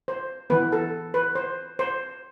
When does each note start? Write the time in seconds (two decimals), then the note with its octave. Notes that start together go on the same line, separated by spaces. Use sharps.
0.08 C5
0.50 E3 B3 B4
0.72 A4
1.14 B4
1.35 C5
1.79 C5